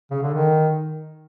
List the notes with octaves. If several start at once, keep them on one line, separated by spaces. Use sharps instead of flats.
C#3
D3
D#3